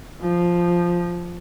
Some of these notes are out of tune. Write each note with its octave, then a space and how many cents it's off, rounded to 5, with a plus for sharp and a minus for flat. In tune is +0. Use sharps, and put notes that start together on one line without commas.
F3 +0